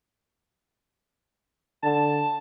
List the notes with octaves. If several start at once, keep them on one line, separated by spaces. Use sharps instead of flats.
D3 A5